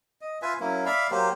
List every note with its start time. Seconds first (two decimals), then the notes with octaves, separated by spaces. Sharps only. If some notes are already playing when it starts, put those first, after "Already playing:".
0.21 D#5
0.42 F4 B4 E5 G#5
0.60 F#3 A#3 C#4 E4
0.86 D5 E5 F5 B5
1.11 F#3 A#3 G4 C5